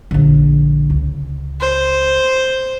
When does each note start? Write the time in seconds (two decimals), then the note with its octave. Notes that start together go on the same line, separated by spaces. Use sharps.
0.11 A#1 D3
0.90 C#2
1.61 C5